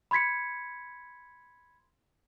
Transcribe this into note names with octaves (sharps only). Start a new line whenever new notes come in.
B5 C6 G#6 B6 C#7